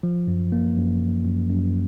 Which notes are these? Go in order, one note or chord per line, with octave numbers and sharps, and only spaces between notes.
F3
F#2
A#3
F#2
F#2
F#2
F#2